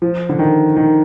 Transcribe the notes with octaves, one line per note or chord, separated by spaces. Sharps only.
F3
D3
D#3
D#3